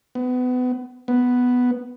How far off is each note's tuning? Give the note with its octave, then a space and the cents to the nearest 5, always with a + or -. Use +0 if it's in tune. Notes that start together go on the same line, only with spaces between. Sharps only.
B3 +25
B3 +0